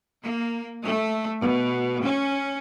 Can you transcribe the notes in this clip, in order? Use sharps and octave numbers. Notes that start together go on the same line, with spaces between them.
A#3
A3
B2
C#4